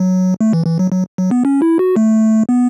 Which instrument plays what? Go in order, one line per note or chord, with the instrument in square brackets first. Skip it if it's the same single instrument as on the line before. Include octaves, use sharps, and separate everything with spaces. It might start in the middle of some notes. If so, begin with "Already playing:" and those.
Already playing: [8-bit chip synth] F#3
A3
E3
E3
F#3
F#3
F#3
B3
C#4
E4
F#4
A3
B3